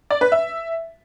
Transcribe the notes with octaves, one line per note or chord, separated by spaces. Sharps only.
D5
B4
E5